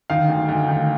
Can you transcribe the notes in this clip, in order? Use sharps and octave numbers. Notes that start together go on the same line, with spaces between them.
D#3 F5
D2
D2
D#3